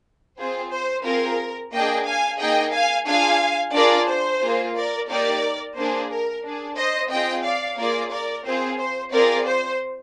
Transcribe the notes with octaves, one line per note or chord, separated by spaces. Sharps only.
C4 F4 G#4 C5
C5
C4 F4 G#4 A#4
A#3 D4 G#4 D#5 G5
F5 G#5
A#3 D#4 G#4 D#5 G5
F5 G#5
D4 F4 G#4 F5 G#5
D4 F4 G#4 A#4 D5
C5
A#3 F4 G#4
A#4 D5
A#3 D#4 G4 A#4 D5
A#3 D4 G#4 C5
A#4
D4 G#4
C5 D#5
C4 F4 G#4 D#5 G5
D5 F5
A#3 F4 G#4 A#4 D5
A#4 D5
C4 F4 G#4 C5
C5
C4 F4 G#4 A#4 D5
C5